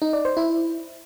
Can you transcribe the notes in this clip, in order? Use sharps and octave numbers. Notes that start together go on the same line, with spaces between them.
D#4
D5
C5
E4